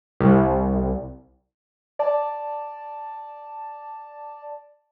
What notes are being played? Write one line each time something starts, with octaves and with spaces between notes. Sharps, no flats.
C2
D5 A5